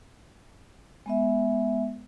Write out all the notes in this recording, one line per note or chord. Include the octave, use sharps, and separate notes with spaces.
G#3 B3 E5